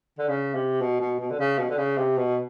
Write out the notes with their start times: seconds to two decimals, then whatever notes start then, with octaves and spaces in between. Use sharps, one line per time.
0.19 D3
0.29 C#3
0.55 C3
0.81 B2
1.00 B2
1.20 B2
1.31 D3
1.39 C#3
1.59 B2
1.70 D3
1.78 C#3
1.98 C3
2.18 B2